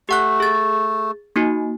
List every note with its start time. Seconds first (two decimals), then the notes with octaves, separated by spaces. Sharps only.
0.09 A3 G4 F#5 F#6
0.40 G#4 A6
1.36 A#3 D#4 F#4